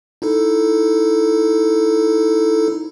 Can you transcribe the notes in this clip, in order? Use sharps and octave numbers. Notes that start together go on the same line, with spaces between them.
D#4 E4 A4